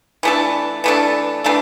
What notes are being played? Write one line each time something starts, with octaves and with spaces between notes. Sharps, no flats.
E3 A3 D4 A4
E3 A3 D4 A4
E3 A3 D4 A4